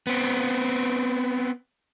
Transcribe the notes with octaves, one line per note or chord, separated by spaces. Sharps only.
B3 C4